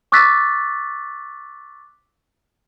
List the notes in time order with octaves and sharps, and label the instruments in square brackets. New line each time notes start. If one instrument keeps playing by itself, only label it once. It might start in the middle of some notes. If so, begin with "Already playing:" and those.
[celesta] C#6 D6 E6 F#6 A6 B6